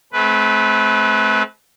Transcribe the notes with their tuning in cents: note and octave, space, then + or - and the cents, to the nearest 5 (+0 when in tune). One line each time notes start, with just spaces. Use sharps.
A3 -40 C4 +0 B4 +0